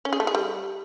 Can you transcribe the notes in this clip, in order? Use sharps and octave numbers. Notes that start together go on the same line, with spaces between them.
C#4
G#4
A3
G#4
G3